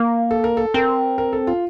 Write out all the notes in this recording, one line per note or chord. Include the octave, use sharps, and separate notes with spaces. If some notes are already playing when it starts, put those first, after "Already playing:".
Already playing: A#3 A#4
A4
A#4
A4
C4 A#4
A#4
A4
F4